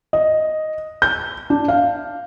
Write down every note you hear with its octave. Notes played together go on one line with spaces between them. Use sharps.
D#5
G6
D4
F5